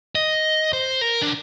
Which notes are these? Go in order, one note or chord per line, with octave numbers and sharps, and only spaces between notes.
D#5
C5
A#4
D4